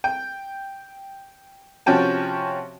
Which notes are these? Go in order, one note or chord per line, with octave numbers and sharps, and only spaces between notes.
G5
C3 F3 C#4 F#4 G5 A5